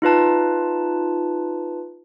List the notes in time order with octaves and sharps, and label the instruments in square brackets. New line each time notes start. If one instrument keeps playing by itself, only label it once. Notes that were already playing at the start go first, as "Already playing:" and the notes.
[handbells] D#4 F4 B4 A5